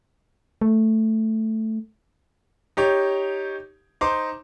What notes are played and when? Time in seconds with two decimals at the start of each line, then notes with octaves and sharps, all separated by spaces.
0.62 A3
2.77 D#4 G4 C#5
4.01 D#4 C5 C6 D6